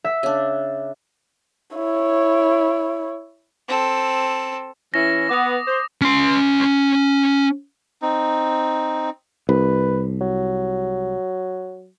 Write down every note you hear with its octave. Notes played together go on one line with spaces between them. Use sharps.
E5
C#3 D4
E4 C#5
C4 A4
E3 C#4 E4 A#6
B3 D6 D#6
C5
C#4 C6
C4 D#4
C2 B4
F#3